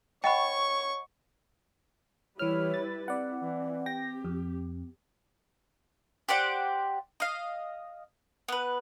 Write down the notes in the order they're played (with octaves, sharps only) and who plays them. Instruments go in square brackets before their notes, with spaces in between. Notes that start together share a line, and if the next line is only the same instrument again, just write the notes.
[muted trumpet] C#5 [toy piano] D#5 F#5 B5 [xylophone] G5 [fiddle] C#6
[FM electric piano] E3 F6 [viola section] G3 E4 B4 [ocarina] C#5
[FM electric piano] A6
[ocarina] C4 [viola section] E4 [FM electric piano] D5 F#5
[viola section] E3
[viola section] G4 [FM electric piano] G5 A#6
[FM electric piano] F2
[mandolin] G4 C5 D5 F#5
D#5 F5
B3 B4